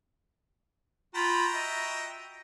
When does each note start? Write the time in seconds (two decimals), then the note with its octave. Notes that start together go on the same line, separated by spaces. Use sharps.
1.15 F4 F#4 G5 A#5 B5
1.55 D#5 E5